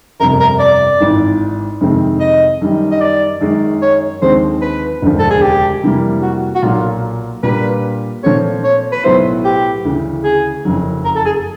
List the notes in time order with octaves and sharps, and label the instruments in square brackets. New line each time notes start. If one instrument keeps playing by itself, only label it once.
[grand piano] G1 F2 C3 [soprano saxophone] A#4
[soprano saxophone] A#4
D5
[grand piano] G#1 G#2 E3
F2 C3 D#3 G#3 C4
[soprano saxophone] D#5
[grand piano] F#2 D#3 G3
[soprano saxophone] D#5
D5
[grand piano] F#2 D#3 G#3 C#4
[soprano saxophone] C#5
[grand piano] D#2 D3 F3 G#3 C4 [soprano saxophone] C5
[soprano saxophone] B4
[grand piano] E1 D2 C#3 F3
[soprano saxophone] A4
G#4
G4
[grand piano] F2 C3 E3 G3 A#3
[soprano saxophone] F#4
F#4
[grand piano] B1 A#2 F#3 A#3 [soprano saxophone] F4
[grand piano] A#2 G3 A#3 D4 F4 [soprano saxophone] B4
[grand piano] A#2 F3 A3 C4 [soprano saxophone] C#5
[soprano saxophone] C#5
B4
[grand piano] B1 A2 F#3 B3 E4 [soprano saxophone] C5
[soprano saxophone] G4
[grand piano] D2 C#3 E3
[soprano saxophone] G#4
[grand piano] F#1 F2 C#3 F#3
[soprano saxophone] A#4
A4
G#4